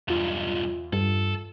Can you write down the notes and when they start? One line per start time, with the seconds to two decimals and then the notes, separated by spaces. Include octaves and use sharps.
0.08 B1 E2 G2 F4
0.93 G2 A4